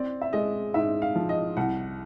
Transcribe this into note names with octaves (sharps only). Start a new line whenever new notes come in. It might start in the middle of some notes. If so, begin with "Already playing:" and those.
Already playing: C4 D5
E5
G#3 D#5
G#2 E5
F5
F3
D#5
C2 F#5